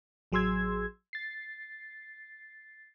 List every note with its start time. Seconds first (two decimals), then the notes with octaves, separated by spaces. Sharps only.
0.32 A1 F#3 G#4 C6 E6 G#6
1.13 A6 C7